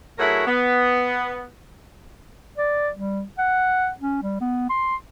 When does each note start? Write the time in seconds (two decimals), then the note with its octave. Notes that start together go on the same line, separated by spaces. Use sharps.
0.19 F#3 A3 E4 F#4 G#4 A#4
0.46 B3
2.58 D5
2.96 G3
3.38 F#5
4.00 C#4
4.23 G3
4.41 B3
4.70 C6